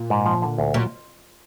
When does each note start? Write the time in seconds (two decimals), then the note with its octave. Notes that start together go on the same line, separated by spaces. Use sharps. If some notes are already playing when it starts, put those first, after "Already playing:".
Already playing: A#2
0.10 G#2
0.26 F3
0.42 D3
0.58 D2
0.74 A#2 F#3